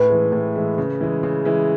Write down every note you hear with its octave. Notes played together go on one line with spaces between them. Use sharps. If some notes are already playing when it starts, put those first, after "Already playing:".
Already playing: A2 B4
E3 G#3
A2
E3 G#3
C#3
E3 G#3
C#3
E3 G#3